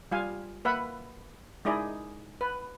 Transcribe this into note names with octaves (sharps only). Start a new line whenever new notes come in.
G3 F4 F5 G#5
A#3 B4 E5 F#5 B5
G#3 D#4 E4 G#4 D5 D#5
B4